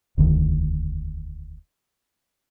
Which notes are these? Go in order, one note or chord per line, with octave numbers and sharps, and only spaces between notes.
E1 D2 D#3